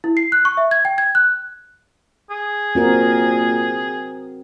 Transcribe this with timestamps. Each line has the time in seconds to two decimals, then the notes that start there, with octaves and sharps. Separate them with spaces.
0.04 E4
0.17 C7
0.32 F#6
0.45 C#6
0.57 E5
0.71 G#6
0.85 G5
0.98 G#6
1.15 F#6
2.30 G#4
2.75 A#2 C4 F#4 A#4